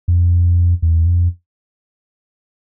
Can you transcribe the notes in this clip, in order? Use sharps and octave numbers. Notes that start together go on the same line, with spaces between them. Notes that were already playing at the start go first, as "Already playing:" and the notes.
F2
E2
F2